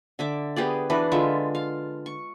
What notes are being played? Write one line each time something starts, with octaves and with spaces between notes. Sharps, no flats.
D3 E5 D6
B3 G4 G#4 D5
E3 D4 F#4 B4
D3 G#3 F4 E5
F5
C#6